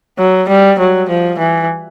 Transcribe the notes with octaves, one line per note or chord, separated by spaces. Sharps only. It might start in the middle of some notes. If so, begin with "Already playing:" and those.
F#3
G3
F#3
F3
E3